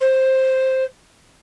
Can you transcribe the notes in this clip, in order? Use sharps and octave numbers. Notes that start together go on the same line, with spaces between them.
C5